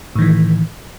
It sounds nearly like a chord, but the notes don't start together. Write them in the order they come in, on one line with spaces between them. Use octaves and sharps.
A2 D#3 E3